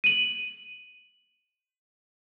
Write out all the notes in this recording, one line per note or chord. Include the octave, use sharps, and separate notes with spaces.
D#7 F#7